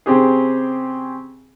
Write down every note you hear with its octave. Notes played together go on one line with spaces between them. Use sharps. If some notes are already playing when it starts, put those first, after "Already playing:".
C#3 C4 G4 G#4